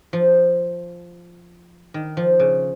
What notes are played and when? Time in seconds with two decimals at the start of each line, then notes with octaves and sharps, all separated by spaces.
0.13 F3
1.94 D#3
2.17 F3
2.40 C#3